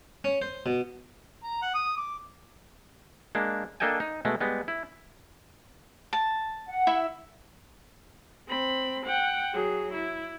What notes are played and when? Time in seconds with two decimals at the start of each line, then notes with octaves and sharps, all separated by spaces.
0.24 C#4
0.42 C5
0.66 B2
1.43 A#5
1.62 F#5
1.74 D#6
1.97 D6
3.35 G#3 A#3 D4
3.80 A#3 D4 A4 D#5 G5 G#5
4.00 D#4
4.25 B2 G#3 A3
4.41 G3 G#3 B3
4.68 E4
6.13 A5
6.68 F#5
6.87 E4 E5
8.48 C4 B5
9.06 F#5 G5
9.53 F#3 G#4
9.93 E4